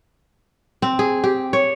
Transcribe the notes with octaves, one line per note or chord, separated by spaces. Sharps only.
C4
G#4
G4
C#5